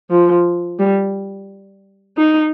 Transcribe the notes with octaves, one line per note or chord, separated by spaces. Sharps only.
F3
G3
D#4